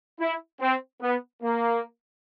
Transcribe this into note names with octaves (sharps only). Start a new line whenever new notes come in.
E4
C4
B3
A#3